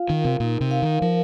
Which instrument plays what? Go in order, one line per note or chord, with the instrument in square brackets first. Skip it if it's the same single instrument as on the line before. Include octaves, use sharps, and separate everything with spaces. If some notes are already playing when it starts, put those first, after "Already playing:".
Already playing: [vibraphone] F4 F5
[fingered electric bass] D#3 [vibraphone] A#4
[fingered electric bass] C3
[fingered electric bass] A#2 [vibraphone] D#4
[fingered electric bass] C3
[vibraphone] F5
[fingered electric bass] D#3
[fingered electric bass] F3 [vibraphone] A#4